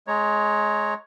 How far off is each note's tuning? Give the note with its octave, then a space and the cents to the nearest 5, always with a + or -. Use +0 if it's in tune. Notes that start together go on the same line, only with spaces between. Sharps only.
G#3 +20 C#5 +0 A#5 +0